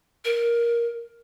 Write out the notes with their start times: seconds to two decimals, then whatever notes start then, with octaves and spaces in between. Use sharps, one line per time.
0.25 A#4